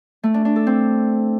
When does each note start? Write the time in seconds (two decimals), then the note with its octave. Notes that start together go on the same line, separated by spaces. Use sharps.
0.23 A3
0.34 D4
0.45 D4
0.56 A4
0.67 C4